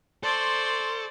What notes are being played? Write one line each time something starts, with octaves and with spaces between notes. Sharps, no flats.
A4 C5 D5 C6 C#6